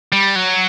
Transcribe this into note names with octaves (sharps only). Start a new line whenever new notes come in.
G3
F#3